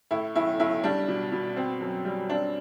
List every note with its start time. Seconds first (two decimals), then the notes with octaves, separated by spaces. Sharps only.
0.11 A2 E4
0.35 B1 E4
0.60 B1 E4
0.84 G3 D4
1.08 B2
1.32 B2
1.56 C4
1.81 F#2
2.05 G3
2.29 C4 D4